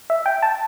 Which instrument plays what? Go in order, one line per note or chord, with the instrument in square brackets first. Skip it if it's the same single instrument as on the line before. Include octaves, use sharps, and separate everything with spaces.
[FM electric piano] E5
G5
A5